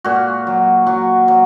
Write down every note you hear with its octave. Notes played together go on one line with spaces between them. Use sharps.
A#2 F#4
F#3
F#3 F#4
F#3